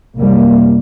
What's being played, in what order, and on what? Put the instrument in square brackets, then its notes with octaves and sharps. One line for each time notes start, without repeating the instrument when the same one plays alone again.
[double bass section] C2 F#2 G3 A#3